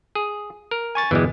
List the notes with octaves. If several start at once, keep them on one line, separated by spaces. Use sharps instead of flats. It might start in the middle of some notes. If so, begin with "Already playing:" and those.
G#4
A#4
G#5 C#6 A6
G1 E2 B2 E3 G3 G#3